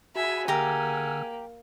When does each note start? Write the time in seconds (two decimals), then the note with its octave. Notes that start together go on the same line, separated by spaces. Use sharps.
0.15 F#4 G#4 E5 F#5 G#5 A5 B5
0.48 D3 A#3 G4 A#5 E6 F6